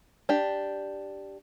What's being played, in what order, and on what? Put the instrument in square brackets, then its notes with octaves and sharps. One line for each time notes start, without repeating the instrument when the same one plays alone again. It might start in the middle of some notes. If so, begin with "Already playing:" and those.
[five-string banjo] D4 G4